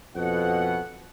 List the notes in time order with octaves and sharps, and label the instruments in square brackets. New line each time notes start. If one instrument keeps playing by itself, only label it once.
[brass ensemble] F2 B2 F#5